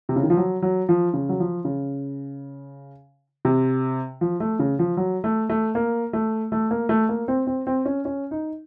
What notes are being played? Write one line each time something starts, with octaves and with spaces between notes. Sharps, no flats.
C3
C#3
D#3
F3
F#3
F#3
F3
C#3
F#3
F3
C#3
C3
F3
A3
C#3
F3
F#3
A3
A3
A#3
A3
A3
A#3
A3
A#3
C4
C4
C4
C#4
C#4
D#4